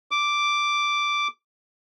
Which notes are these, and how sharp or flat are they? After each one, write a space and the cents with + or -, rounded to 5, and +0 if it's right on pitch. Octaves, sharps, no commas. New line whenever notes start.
D6 +0